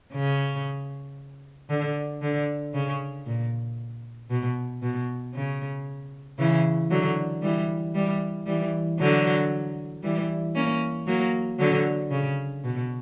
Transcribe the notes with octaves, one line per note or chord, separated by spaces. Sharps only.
C#3
D3
D3
C#3
A#2
B2
B2
C#3
C#3 E3
D3 F#3
E3 G3
E3 G3
E3 G3
D3 F#3
E3 G3
A#3 C#4
F#3 A#3
D3 F#3
C#3
B2